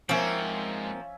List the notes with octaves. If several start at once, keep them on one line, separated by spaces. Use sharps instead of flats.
G#2 F3 A#3 C4 C#4 E5 F#5 G#5